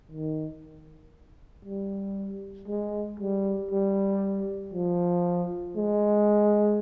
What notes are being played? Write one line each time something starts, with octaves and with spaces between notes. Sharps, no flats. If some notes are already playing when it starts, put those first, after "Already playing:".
D#3
G3
G#3
G3
G3
F3
G#3